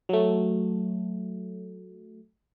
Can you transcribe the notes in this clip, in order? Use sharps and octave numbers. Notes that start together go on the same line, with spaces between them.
F#3 A3